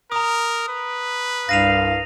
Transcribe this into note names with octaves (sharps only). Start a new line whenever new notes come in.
A#4 A#5 D#6
B4
C2 G2 F5 A#6 D#7 F7